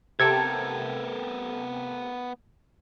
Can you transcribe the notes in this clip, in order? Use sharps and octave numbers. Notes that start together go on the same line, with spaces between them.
C3 B3 A4 A#4 G5 G#6